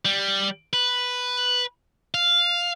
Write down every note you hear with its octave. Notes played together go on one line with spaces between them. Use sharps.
G3
B4
F5